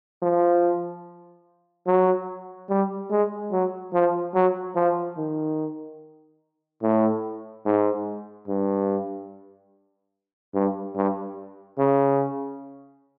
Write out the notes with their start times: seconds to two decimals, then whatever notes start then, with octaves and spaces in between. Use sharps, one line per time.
0.22 F3
1.87 F#3
2.70 G3
3.11 G#3
3.52 F#3
3.94 F3
4.35 F#3
4.76 F3
5.17 D#3
6.83 A2
7.66 G#2
8.48 G2
10.54 G2
10.96 G2
11.79 C#3